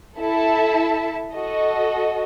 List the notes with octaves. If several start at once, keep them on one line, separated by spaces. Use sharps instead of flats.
E4 A4 E5 A5
F#4 A4 D#5